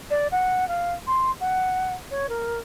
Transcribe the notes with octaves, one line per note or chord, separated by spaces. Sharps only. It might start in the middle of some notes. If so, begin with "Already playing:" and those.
D5
F#5
F5
C6
F#5
C#5
A#4